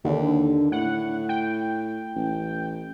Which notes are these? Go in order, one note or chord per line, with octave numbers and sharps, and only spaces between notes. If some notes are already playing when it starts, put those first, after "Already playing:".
D#2 D3
A2 F#5
G5
A1